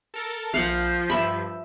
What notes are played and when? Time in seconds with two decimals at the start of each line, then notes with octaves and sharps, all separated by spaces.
0.14 A4 A#4 A6
0.54 A#1 F3 F5 F#5 G6 C7
1.10 G2 E5 B5